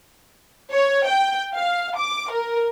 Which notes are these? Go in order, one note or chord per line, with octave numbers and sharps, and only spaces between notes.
C#5
G5
F5
D6
A#4